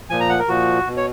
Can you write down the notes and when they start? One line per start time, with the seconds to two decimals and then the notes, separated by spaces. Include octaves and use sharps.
0.10 A#2 F3 G#5
0.20 A#5
0.30 F#5
0.39 A#4
0.48 A#2 F3 F#4
0.86 B2
0.97 C#5